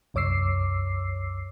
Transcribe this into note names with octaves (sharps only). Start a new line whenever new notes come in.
C2 F#2 C#5 D6 E6 C7